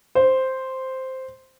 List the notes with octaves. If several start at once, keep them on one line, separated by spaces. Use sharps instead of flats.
C5